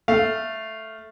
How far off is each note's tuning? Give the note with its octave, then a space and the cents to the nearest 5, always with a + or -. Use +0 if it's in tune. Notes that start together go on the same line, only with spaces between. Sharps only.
A3 +0 F5 +0